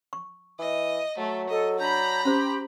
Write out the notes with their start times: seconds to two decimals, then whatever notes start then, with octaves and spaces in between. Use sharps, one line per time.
0.13 C#6
0.59 E3 D#5
1.18 F#3 A3
1.49 A4 D#5
1.78 D4 A#5 B5 G6
2.25 C#4 G4 C5 C6